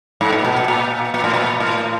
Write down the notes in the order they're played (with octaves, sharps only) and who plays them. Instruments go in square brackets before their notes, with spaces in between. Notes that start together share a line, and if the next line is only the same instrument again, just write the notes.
[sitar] G#2
A#2
B2
A#2
A#2
A#2
A2
A#2
A2